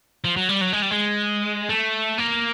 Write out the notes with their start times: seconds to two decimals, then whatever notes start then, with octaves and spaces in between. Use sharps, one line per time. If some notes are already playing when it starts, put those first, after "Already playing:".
0.24 F3
0.37 F#3
0.49 G3
0.61 F#3
0.73 G#3
0.82 G3
0.91 G#3
1.69 A3
2.19 A#3